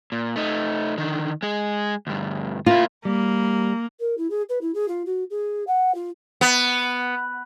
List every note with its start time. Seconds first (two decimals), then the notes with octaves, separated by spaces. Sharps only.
0.12 A#2
0.36 A3 D#4
0.98 D3 D#3
1.43 G#3 G#4
2.07 D2 G2
2.66 A#3 E4 F4
3.05 G3 A#3
4.00 A#4
4.17 E4
4.30 G#4
4.49 B4
4.61 E4
4.74 G#4
4.88 F4
5.06 F#4
5.30 G#4
5.67 F#5
5.94 F4
6.41 B3